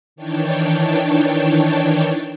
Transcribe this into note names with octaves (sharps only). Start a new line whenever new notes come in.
D#3 E3 D4 C#5 G5 A5